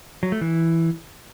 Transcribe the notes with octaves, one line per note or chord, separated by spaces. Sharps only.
F#3
A3
E3